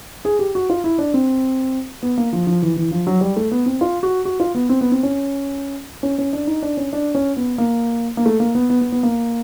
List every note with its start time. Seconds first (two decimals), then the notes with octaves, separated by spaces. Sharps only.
0.25 G#4
0.39 G4
0.55 F#4
0.70 F4
0.84 E4
0.99 D4
1.14 C4
2.03 B3
2.18 A#3
2.33 F3
2.47 F3
2.62 E3
2.77 E3
2.91 F3
3.07 F#3
3.21 G3
3.36 A3
3.51 B3
3.66 C4
3.81 F4
4.03 F#4
4.25 F#4
4.40 F4
4.55 B3
4.69 C4
4.81 B3
4.92 C4
5.03 C#4
6.03 C#4
6.18 C#4
6.33 D4
6.47 D#4
6.62 D4
6.77 C#4
6.93 D4
7.15 C#4
7.37 B3
7.58 A#3
8.17 A#3
8.26 A3
8.40 A#3
8.55 B3
8.70 B3
8.81 B3
8.92 B3
9.03 A#3